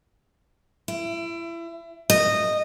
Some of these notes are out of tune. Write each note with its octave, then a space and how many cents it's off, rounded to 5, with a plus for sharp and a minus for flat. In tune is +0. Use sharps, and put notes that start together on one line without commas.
E4 +30
D#5 -15